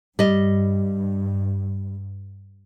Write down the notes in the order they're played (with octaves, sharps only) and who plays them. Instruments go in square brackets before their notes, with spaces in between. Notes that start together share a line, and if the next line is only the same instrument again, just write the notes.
[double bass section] G2 [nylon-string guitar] G3 D#5